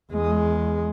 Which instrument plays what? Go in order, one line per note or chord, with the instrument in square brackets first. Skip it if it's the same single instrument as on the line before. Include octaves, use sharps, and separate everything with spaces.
[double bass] E2 G#3